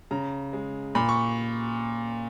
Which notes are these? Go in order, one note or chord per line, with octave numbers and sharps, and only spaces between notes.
C#3 A#5
G#3
A#2 B5
C#6